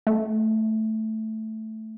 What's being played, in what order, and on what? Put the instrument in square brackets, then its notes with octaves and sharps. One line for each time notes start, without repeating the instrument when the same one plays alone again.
[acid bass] A3